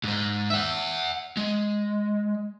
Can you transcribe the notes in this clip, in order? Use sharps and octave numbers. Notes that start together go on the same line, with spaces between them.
G#2 G#3
E5 F#5
G#3